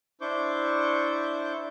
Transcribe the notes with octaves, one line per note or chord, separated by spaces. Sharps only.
D4 E4 C5 C#6 D6 G6